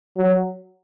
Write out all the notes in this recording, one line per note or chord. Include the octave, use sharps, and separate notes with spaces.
F#3